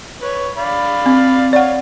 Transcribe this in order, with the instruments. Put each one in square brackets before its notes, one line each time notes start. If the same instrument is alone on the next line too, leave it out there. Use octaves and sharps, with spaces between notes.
[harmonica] B4 C#5
D5 F5 B5
[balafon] C4
[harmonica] C#5 F5 [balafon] D5 F#5